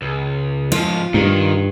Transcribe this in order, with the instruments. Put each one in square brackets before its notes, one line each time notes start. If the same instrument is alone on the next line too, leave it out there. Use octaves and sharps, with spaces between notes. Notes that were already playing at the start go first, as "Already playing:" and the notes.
[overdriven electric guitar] C#2
[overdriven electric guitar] G#2 F3 [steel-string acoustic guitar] F4
[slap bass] G2 [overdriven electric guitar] D#3